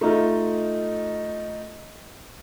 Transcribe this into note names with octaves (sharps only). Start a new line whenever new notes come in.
A3 D#4 F4